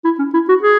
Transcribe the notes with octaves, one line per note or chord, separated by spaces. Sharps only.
E4
C#4
E4
F#4
G#4